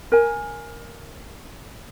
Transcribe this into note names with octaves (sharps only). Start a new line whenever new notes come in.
A#4 G#5